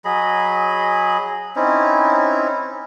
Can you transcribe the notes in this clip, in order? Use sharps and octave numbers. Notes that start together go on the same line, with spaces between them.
F#3 G#4 D#5 B5
C4 C#4 D#4 E4